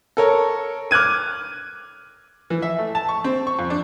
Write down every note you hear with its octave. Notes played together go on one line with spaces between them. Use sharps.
A4 A#4 C#5
D6 F6 F#6 G#6 D#7
E3
E5
A3
A5
C#6
C4
C#6
F2
D4